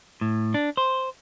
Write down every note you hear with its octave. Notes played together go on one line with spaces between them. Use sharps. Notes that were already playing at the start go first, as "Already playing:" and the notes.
A2
D4
C5